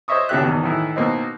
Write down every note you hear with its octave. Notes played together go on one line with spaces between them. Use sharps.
C5 C#5 D#5 E5 C#6 D#6
C#2 B2 D4 G4 E5 F#6
E2 B2 D#3
A2 D#3 E3 E4
B2 A#3 C4 D#4